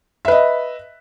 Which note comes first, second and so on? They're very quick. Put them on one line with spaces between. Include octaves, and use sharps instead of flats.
E5 B4 D#5